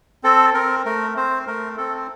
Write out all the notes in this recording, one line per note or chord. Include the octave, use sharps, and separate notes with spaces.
C4 A4
C4 A#4
A3 A#4
C4 C5
A3 A#4
C4 A4